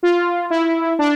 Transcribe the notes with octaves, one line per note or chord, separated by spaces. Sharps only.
F4
E4
D4